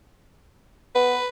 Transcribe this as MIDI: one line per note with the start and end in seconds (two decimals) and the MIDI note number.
0.95 1.18 59
0.95 1.28 71